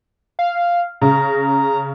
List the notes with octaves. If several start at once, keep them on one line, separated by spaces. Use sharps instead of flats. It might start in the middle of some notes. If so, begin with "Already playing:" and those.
F5
C#3 A#5